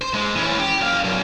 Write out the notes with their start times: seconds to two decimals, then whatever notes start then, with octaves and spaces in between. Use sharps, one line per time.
0.01 C5
0.13 G#2 G#3
0.35 E3 C#4
0.59 G4
0.81 F#2 F5
1.04 B1 F#2